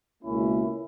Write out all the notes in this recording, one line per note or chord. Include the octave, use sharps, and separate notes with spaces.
C#2 B2 A#3 C#4 E4